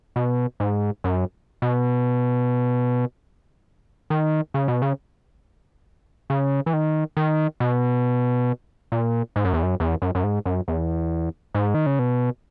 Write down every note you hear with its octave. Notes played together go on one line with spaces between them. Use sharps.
B2
G#2
F#2
B2
D#3
C#3
B2
C#3
C#3
E3
D#3
D#3
B2
A#2
G#2
F#2
E2
F#2
E2
F#2
F#2
G#2
F#2
E2
G#2
D#3
C#3
B2